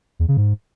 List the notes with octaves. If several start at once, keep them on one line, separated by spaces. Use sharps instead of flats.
E2
C#3
G#2